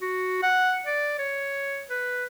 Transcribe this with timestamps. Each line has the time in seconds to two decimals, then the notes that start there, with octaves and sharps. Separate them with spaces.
0.02 F#4
0.43 F#5
0.86 D5
1.19 C#5
1.90 B4